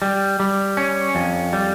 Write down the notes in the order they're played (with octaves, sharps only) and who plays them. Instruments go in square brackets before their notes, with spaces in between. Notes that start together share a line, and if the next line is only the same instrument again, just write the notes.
[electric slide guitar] G3
G3
C#4
F2
G3